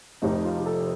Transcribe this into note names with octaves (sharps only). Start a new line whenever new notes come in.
F1 F2 C3 D#3 D#4
F4
G4
A4